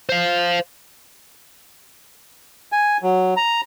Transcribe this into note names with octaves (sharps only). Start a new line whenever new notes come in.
C5 F5
G#5
F#3
A#5